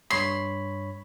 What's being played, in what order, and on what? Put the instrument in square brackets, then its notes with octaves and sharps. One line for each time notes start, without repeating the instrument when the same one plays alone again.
[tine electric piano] G2 C#5 B5 [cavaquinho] C6